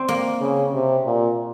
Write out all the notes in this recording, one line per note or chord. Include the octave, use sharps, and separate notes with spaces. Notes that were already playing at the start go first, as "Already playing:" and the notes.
Already playing: C4
A#3
C#3
C3
A#2